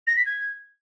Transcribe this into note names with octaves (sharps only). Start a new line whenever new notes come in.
A#6
B6
G#6